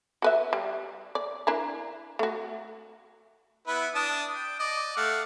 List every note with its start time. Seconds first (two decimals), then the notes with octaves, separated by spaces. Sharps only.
0.22 F#4 B4 E5
0.53 G3
1.15 D5
1.47 D4 E4 A#4
2.19 A3 F#4
3.67 B3 E4 B4
3.95 D4 A5 D#6
4.35 G5
4.60 D5 D#5
4.97 A3 F5 F#5